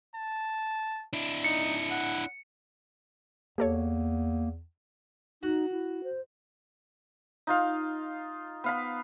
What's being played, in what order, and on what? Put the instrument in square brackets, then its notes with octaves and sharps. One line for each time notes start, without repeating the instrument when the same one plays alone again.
[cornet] A5
[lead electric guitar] D4 E4
[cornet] D#4 [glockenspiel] C#7
[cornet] F#5
[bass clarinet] E2 [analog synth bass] A#3 [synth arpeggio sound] G4 A4 C#5
[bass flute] D#4 [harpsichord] F#4
[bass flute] E4
C5
[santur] D#4 F4 F5
B3 F5 B5